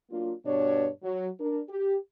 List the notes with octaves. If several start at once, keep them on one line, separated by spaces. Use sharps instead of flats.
F#3 A#3 D4 F4
G2 B2 D4 C#5
F#3
D4 A#4
G4